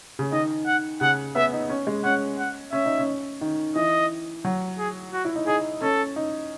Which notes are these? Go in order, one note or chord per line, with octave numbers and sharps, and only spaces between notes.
C#3
D#3 D#5
F#5
C#3 F#5
B3 E5
D#4
C#4
G#3
C#4 F#5
F#5
C#4 E5
D#4
C#4
D#3
E3 D#5
F#3
G#4
F#4
E4
D#4
D#4 G#4
C#4 A4
D#4